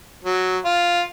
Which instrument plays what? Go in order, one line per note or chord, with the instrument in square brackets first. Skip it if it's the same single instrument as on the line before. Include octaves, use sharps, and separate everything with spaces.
[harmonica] F#3
F4